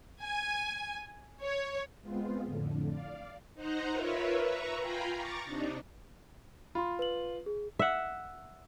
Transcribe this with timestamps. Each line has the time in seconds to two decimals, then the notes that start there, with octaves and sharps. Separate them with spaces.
0.22 G#5
1.42 C#5
2.02 G#3 B3 C4 F4
2.44 F2 A2 D3
2.88 D5 F5
3.55 D#4 C5 F#5 A#5
3.91 F4 A#4 B4 C#5 E5
4.37 B4 E5 A#5 C#6
4.78 F4 F5 G5 G#5 A#5 B5
5.15 A#5 C#6 D6 A6
5.45 C3 D4 D#4
6.75 F4 B5 C6
6.99 B4 F#7
7.46 G#4
7.79 E5 F#5